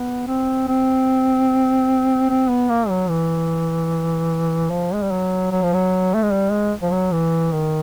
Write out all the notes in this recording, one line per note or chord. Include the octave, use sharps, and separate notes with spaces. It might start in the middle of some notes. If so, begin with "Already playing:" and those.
Already playing: B3
C4
C4
C4
B3
A#3
F#3
E3
F3
G#3
G3
F#3
F#3
F3
F#3
A3
G#3
G3
G#3
F3
F#3
E3
D#3